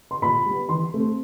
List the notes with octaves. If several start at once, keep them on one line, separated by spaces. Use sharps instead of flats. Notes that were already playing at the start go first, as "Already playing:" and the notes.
C6
A#2 B5
G3 B3
E3 C6
A3 C4